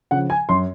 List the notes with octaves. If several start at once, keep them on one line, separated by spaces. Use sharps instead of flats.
C#3 F3 F#5
G#5
F#2 C6